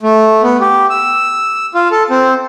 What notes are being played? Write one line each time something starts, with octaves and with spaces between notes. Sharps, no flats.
A3
B3
G4
E6
F4
A4
C4